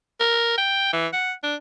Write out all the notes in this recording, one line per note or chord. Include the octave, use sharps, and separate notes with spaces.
A#4
G5
E3
F#5
D4